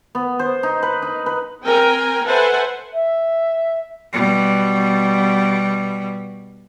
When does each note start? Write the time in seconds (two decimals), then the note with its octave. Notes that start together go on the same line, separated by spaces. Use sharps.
0.15 B3
0.39 C5
0.63 D#4
0.83 B4
1.02 D#4
1.26 B4
1.64 C4 A#4 G5 G#5
2.25 A4 B4 C5 E5 F#5 G#5
2.93 E5
4.13 B2 G3